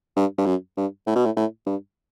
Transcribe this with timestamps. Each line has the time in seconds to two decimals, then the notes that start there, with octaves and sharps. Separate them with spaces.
0.16 G2
0.38 G2
0.46 F#2
0.77 G2
1.06 A2
1.15 B2
1.25 A2
1.36 A2
1.66 G2